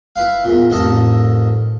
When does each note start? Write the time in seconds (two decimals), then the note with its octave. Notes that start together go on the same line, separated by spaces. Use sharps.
0.16 E4 B4 F5
0.45 E2 A#2
0.70 A1 F2 D#3 A4 D#5